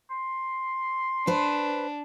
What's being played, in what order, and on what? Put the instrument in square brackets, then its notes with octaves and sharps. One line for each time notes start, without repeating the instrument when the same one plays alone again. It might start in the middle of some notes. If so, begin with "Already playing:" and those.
[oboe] C6
[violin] D4 [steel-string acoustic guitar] B4 C5